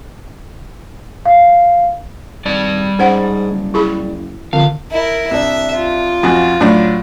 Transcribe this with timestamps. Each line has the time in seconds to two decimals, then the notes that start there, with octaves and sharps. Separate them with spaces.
1.25 F5
2.46 G#1 G3 D5 A5
2.99 G#2 C#4 C5 F#5
3.51 F#1
3.74 E4 G#4 B5
4.53 F2 D3 F5
4.91 E4 A#4
5.31 C2 D4 E5
5.74 F4
6.23 F2 F#4 G#5
6.61 A2 F#3 D4